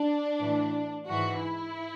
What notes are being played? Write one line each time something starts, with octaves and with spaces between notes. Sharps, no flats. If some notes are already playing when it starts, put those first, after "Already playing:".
Already playing: D4
A2 E3
G#2 E3 F#4
E4